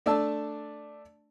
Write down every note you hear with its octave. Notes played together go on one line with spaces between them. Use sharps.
A3 D4 D5 A5 E6